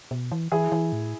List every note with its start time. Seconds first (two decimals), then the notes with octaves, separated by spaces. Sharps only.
0.11 B2
0.32 E3
0.52 E3 E4 G#4
0.72 E3
0.92 A2